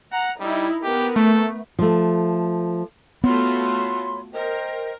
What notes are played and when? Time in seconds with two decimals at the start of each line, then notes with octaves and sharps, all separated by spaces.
0.12 F#5 A#5
0.40 G3 D#4 E4
0.83 B3 G4 A#4
1.16 A3 A4
1.79 F3 A3
3.24 A3 B3 F4 F#4 C#5 B5 C6
4.33 A#4 C5 D#5 G5